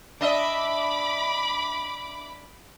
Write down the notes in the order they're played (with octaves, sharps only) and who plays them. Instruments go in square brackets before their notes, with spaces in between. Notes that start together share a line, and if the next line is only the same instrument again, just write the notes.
[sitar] D4 D#5 E5 [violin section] B5 D6